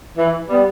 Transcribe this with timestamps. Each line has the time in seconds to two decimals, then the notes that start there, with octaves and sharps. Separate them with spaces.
0.17 E3
0.49 G3 B3